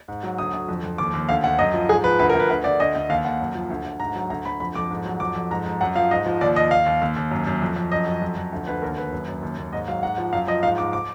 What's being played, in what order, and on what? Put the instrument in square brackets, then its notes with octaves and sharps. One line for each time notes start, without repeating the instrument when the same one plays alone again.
[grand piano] G#2
F#3
D2 D#6
D2
F2
F2
D#2 D6
D#2
D2 F5
D2 F#5
F#2 D#5
F3
G#2 G#4
F3 B4
D2 B4
A#4
D2
B4
D2 B4
D2 D5
D2 D#5
D2
D#2 F5
D#2 F#5
F#2
F3
D2
D2
G#2 A#5
F#3
D2 A#5
D2 B5
F2 B5
F2 D6
G#2
F#3
F2 D6
F2
G#2 A#5
G#2
F#2 F#5
F3 F5
G#2 D#5
F3
D#2 D5
D#2 D#5
D#2 F5
D#2
D#2
D#2
F#2
F#2
F2
F2
F#2 D#5
F#2
F2
F2
D2
D2 B4
D#2 A#4
D#2 B4
F#2
F#2
D#2
D#2
G#2 D#5
F#3 F5
G#2 F#5
F3
F#2 F5
F3 D#5
G#2 F5
G#2 D6
D6